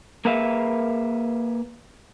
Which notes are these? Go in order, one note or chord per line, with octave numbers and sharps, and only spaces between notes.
A#3 G#4 A#4 B4 E5 F5